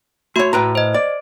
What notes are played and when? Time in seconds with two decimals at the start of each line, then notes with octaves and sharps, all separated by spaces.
0.36 A3 F#4 C#5 C6
0.53 A2 B4 A#5
0.75 C5 D#5
0.94 D5